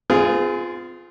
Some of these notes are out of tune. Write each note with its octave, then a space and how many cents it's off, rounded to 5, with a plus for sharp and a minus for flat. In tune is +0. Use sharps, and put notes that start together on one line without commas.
C4 -40 F4 +0 G#4 +0